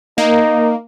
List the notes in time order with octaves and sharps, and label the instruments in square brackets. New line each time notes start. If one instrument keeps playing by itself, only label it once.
[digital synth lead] A#3 [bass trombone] D#4